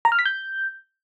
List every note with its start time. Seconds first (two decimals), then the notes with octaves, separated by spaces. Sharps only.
0.05 A#5
0.12 F6
0.19 B6
0.26 G6